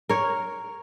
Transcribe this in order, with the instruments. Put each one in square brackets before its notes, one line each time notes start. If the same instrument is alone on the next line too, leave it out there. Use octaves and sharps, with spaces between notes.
[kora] A#4 C#5